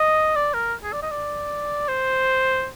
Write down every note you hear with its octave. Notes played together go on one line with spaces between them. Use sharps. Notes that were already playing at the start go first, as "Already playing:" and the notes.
Already playing: D#5
D5
A#4
G#4
D5
D#5
D5
C5